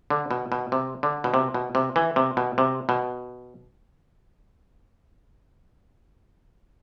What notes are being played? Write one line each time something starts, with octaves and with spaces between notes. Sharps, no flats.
D3
B2
B2
C3
D3
B2
C3
B2
C3
E3
C3
B2
C3
B2